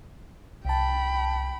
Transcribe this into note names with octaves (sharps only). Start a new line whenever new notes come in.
C2 G5 A5 B5